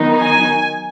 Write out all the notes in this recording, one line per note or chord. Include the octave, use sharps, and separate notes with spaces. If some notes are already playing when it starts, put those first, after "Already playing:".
Already playing: D#3 F#3 B3 D#4
G#5